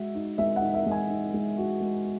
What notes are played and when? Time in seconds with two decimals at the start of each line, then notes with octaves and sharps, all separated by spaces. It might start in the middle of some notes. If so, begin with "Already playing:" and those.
Already playing: G#3 F#4 E5
0.15 D#4
0.38 G#3 E5
0.56 F#5
0.62 D#4
0.74 E5
0.86 G#3
0.92 G#5
1.10 D#4
1.34 G#3
1.58 F#4
1.81 G#3